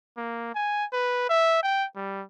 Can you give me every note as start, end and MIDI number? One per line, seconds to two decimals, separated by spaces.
0.17 0.51 58
0.55 0.85 80
0.93 1.24 71
1.29 1.63 76
1.63 1.86 79
1.96 2.22 55